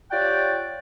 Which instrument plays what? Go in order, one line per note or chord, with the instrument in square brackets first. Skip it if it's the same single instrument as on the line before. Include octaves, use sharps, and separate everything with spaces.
[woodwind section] F4 G4 C#5 D5 F#5 G5